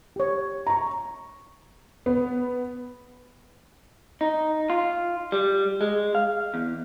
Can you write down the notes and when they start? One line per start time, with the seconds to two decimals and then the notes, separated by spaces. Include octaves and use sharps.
0.16 G4 C#5
0.67 A#5 C#6
2.06 B3
4.21 D#4
4.70 F4
5.32 G3
5.81 G#3
6.15 F5
6.54 E2